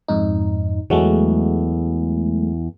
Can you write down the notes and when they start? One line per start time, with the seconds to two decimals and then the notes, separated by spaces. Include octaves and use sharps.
0.08 F2 G#2 D#4
0.90 E2 F#3 G#3 A3 F#4